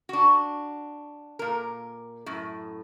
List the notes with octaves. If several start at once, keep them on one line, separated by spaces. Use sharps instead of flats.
D4 F#4
A#2 A#4
F#2 A2